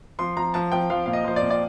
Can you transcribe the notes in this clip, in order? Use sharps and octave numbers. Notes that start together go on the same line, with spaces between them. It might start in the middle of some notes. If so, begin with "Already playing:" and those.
F3 C6
F3 A#5
F3 A5
F3 G5
F3 F5
A#2 F5
D#5
F3 C5
D5
A#2
D5